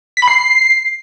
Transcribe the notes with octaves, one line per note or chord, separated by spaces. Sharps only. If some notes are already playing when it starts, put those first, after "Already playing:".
B6
B5
C7